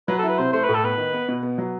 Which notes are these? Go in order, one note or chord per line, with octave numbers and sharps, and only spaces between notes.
F#3 B4
E4 A4
B4
C3 C5
A3 C5
A2 B4
A4
B3 B4
D#3
B3
B2
B3
F#3